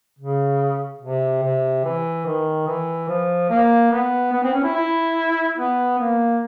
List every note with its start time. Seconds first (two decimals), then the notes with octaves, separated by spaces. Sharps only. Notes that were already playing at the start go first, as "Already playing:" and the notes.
0.19 C#3
1.01 C3
1.43 C3
1.84 E3
2.26 D#3
2.67 E3
3.09 F3
3.49 A#3
3.91 B3
4.33 B3
4.43 C4
4.53 C#4
4.64 E4
4.75 E4
5.57 B3
5.99 A#3